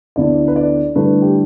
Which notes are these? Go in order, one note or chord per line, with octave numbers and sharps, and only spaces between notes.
D2 D3 B3 E4 D5
B4
D5
G2 D3 A3 E4 B4
G4